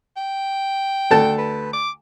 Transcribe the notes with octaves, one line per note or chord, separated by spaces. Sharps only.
G5
D2 A4 A5
B4
D6